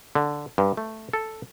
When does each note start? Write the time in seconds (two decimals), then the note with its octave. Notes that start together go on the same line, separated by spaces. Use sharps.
0.15 D3
0.58 G2
0.77 A3
1.13 A4